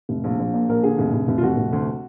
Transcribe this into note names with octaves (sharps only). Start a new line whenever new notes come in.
F1
A#1
A#1
A#2
A#1 A#4
D3 G#4
F1
F1
F1
F4
F1 F#4
F1
D2